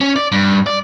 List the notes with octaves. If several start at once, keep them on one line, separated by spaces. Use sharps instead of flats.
C#4
D5
G2
D5